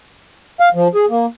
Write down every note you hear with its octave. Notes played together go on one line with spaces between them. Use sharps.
F5
F3
G#4
A#3